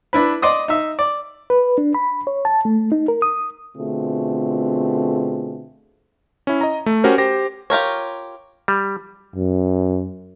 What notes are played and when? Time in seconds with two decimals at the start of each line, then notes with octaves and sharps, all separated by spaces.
0.13 D4 E4 B4
0.42 D5 D#5 C6 D#6
0.68 D#4 E5
0.99 D5
1.50 B4
1.78 D4
1.95 B5
2.27 C#5
2.45 A5
2.65 A3
2.92 D#4
3.08 A#4
3.22 D#6
3.76 B2 D3 A3 C4 F4 G#4
6.47 C#4 E4
6.61 D#5 A#5
6.86 A3
7.04 C#4 F#4 G4 A#4 C5
7.18 G4 C5 A#6
7.70 F4 G4 A#4 C#5
8.68 G3
9.35 F#2